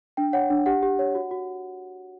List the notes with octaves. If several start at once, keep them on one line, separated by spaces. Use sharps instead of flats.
D4 G5
C#5 F#5
D4
G4 F#5
G4
C#5
F#4
F#4